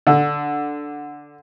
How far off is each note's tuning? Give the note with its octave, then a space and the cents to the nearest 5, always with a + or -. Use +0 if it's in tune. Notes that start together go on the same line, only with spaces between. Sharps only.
D3 +0